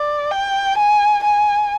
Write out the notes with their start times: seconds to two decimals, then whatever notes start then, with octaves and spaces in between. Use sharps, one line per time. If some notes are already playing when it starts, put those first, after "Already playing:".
Already playing: D5
0.31 G5
0.78 G#5
1.24 G#5